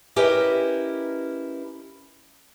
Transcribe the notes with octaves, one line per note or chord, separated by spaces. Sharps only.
C#4 E4 G4 A#4 B4 D#5